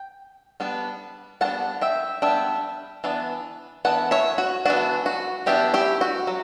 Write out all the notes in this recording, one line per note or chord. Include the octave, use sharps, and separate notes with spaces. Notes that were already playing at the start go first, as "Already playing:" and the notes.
Already playing: G5
G3 B3 D4
G3 B3 D4 F#5 A5
E5 G5
G3 B3 D4 E5 G5
E3 B3 D4
E3 B3 D4 F#5
C#5 E5
F#4
E3 B3 D4 F#4
F#4
E3 B3 D4 E4 G4
E4 G4
F#4
F#3